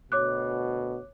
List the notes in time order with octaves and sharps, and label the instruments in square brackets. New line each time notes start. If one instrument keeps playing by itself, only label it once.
[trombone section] D2 B2 [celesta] C#5 D6 F#6